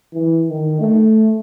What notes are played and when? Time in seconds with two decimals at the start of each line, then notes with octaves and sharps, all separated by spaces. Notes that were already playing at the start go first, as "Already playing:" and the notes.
0.13 E3
0.49 D#3
0.80 A3